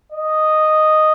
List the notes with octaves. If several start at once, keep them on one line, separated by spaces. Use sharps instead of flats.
D#5